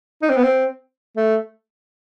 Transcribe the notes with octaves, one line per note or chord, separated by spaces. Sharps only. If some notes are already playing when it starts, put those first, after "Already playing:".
D#4
C4
B3
C4
A3